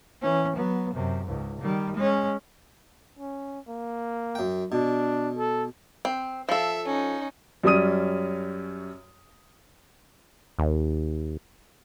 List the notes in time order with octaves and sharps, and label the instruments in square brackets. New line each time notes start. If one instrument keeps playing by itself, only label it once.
[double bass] E3 C#4
F#3 B3
F#2 C3
C#2 G#2
D#3 G3
G#3 C#4
[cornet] C#4
A#3
[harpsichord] F#2 G5
[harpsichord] B2 [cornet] D4
[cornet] A4
[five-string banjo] C4
[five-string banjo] F3 A4 [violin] E5
[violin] C#4 D#4
[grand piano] F#2 G3 C#4 D#6 D#7
[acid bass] D#2